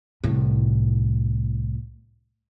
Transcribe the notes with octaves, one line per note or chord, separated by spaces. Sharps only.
C2 A2